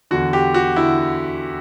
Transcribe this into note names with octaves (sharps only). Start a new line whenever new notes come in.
E2 D3 F#4
G4
F#4
D3 E4